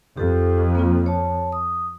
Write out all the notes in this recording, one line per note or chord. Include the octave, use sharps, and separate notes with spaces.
F2 G4 A4
A#3 C4 F4
C#5 A5
D#6